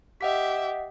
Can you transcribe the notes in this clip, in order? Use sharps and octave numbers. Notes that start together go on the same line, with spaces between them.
G4 D#5 E5 F#5 B6